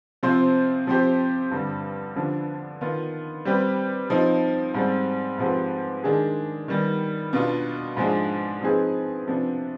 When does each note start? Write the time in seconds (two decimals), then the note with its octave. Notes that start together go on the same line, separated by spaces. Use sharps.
0.23 C3 F3 C4 F4 C5
0.87 F3 C4 G4 C5
1.51 G2 D3 G3
2.16 D3 F3 B3 D4
2.81 D#3 B3 F4
3.45 G3 C4 G4 B4
4.10 F3 C4 D#4
4.74 G#2 G3 C4
5.38 G#2 F3 C4 G4 B4
6.04 D#3 G#3 D4 G#4
6.68 D#3 G3 B3
7.33 B2 B3 D4 F4
7.97 G#2 F3 G#3 D4
8.61 F3 C4 D#4 G#4 B4
9.26 C3 F3 B3 D4